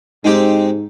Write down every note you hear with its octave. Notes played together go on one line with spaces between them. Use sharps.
G#2 G#3 C4 D#4 G4